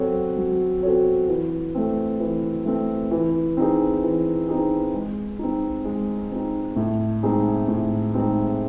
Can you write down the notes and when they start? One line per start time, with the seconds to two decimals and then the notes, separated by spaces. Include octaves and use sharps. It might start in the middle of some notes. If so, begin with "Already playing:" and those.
Already playing: F#3 C4 F#4 A4 C#5
0.37 F#3
0.83 C4 F#4 A4 C#5
1.28 E3
1.75 A3 C4
2.20 E3
2.65 A3 C4
3.11 E3
3.57 C4 D#4 G#4
4.03 E3
4.48 C4 D#4 G#4
4.94 G#3
5.39 C4 D#4
5.85 G#3
6.31 C4 D#4
6.76 A2
7.23 G#3 C4 D#4 G#4
7.68 A2
8.14 G#3 C4 D#4 G#4